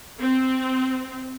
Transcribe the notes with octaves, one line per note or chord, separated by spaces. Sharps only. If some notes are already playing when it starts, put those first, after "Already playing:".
C4